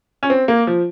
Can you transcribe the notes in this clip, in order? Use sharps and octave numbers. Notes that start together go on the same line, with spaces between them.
C#4
C4
A#3
F3